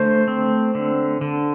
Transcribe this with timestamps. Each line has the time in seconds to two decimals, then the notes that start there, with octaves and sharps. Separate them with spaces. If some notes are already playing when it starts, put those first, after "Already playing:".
Already playing: D3 A3 C5
0.28 C4
0.75 D3
1.21 D3